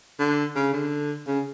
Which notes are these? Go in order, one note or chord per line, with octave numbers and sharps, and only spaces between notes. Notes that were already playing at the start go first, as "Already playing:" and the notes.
D3
C#3
D3
C#3